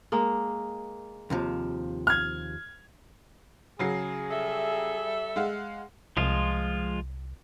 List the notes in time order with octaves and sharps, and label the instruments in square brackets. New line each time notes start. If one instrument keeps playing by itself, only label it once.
[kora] G#3 A#3
[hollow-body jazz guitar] D#2 C3 F3
[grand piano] F6 G#6
[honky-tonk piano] C#3 F#3 C7 [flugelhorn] G#4
[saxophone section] G3 A4 E5
[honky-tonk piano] G#3 F5 F#5
[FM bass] C2 [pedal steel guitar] F3 G#3 F4